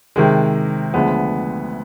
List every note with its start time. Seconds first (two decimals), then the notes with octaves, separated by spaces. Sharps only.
0.16 C3 D#3 G#3
0.94 D2 D3 F3 G#3 B3